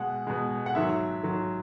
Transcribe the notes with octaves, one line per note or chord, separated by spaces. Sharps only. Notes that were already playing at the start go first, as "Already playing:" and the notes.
Already playing: B2 G#3 F#5
B2 G#3
F#5
G#2 D#3 F#3 E5
G#2 D#3 F#3